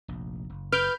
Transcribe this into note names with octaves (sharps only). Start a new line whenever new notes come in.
F1 A#1
F#1
B4 F6 G6 D7